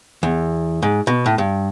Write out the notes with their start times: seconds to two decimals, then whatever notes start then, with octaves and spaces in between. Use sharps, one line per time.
0.23 E2
0.82 G#2
1.07 B2
1.26 A2
1.38 G2